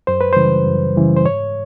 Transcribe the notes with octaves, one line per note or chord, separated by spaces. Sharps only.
F#2 C5
B4
C#3 E3 G3 C5
F#2
C#3 E3 G3
C5
G#2 C#5